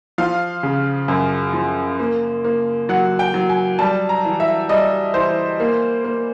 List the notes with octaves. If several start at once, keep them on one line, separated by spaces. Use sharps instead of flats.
F3 F5
C#3
F#2
F3
A#3
A#3
F#3 F#5
G5
F#3
G#5
G3 A5
A#5
E3
E5
G3 D#5
E3 C5
A#3
A#3